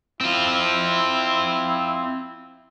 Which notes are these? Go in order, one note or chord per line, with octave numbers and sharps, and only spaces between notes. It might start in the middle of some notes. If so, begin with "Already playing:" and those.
C4 E4 F4